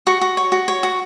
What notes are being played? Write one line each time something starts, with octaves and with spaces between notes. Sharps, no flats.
F#4 C#6
F#4
C#5
F#4
C#5
F#4